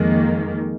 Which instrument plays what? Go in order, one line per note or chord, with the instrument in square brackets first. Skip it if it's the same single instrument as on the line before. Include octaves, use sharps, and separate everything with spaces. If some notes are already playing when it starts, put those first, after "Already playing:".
Already playing: [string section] F2 D#3 A#3 [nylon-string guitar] G#3